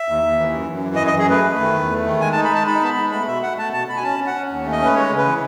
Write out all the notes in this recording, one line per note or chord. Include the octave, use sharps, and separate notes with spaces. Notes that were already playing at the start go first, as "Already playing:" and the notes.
Already playing: E5
D#2
D#2
E3
F#2
F#2
E3
D#5
F#2
D#5
F#2 G#4
A3 B4
A3
D#3
E2
A3
D#3
G#3 G#5
A5
D#4
B5
G#3 A5
D#4 B5
B3 A5
B5
G#3
A3 B5
B2 E5
A3 F#5
A3 A5
B2 A5
B2 B5
G#5
C#4 A5
C#4
F#5
C#4
D#2
A3
D#5
C#4 B4
G#3 C#5
C#3
B4
E3